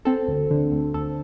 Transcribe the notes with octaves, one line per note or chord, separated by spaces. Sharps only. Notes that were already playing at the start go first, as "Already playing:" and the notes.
C4 A4
D2
D3
D2
D2 A4